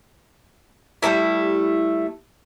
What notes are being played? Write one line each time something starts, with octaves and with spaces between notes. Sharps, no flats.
G3 A3 A#3 E4